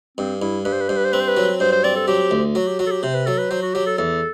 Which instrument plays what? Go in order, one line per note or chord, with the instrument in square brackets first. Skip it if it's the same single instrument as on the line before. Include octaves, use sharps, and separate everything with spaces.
[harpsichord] G2 [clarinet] C4
[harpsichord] G2 [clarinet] E4
[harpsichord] G2 [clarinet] B4
[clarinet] C5
B4
[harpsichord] G2 [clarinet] C5
[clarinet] B4
C5
[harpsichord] C4 [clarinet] B4
[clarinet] C5
B4
[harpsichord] F#3
[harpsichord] G2 [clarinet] C5
[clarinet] C5
[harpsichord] C4 [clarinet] D5
[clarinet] A4
[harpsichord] F#3 [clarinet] G4
[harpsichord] D2
[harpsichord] F#3 [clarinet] F#4
[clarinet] G4
[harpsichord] F#3 [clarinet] F#4
[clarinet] A4
G4
[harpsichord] C3 [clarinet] C5
[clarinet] B4
[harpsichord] F#3 [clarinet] A4
[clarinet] B4
[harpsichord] F#3 [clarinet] C5
[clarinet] F#4
[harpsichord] F#3 [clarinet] G4
[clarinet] A4
[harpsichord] E2 [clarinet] A4